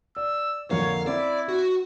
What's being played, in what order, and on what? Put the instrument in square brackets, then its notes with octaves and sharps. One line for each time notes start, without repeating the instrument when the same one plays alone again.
[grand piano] D5 [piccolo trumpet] E6
[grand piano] F2 D3 A#3 [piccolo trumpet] C#5 [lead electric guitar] F5
[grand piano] C4 [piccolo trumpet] E4 [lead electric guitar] D5
[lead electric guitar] F#4